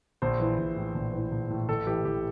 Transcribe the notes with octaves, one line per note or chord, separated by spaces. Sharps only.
A#1 C5
E3
A#1
A2
A#1
E3
A#1
A2
A1 A4
E3 G4
A1 G4